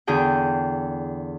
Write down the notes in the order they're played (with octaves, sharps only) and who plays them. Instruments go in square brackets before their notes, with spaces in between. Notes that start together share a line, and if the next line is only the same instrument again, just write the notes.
[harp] E2 D3 G#4 G5